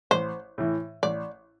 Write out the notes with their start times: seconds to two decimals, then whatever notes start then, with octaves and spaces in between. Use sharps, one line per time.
0.11 A1 C5
0.58 A2 E3
1.03 A1 D5